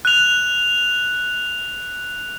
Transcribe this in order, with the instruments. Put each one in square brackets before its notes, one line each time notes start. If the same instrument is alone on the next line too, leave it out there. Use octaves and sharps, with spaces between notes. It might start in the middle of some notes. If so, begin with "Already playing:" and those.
[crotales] F#6 F7